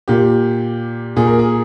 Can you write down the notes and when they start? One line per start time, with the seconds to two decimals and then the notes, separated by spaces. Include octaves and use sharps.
0.08 A#2 G4
1.16 A#2 G#4
1.27 A#4
1.39 G#4